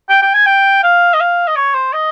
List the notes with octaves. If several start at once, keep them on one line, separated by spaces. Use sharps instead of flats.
G5
G5
G#5
G5
F5
D#5
F5
D#5
C#5
C5
D#5